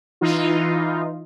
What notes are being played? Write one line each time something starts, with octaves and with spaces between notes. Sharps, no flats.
E3 D#4 F4